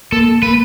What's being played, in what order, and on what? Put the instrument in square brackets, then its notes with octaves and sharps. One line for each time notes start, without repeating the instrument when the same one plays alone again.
[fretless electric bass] A#3 [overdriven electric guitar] A4
[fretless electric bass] A#3 [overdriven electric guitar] B4